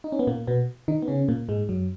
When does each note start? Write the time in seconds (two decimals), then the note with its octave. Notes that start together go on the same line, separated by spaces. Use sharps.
0.04 D#4
0.12 C#4
0.19 B3
0.27 A#2 A#3
0.47 B2 B3
0.88 D#3 D#4
1.02 B3
1.08 C#3 C#4
1.29 A#2 A#3
1.49 G#2 G#3
1.69 F#2 F#3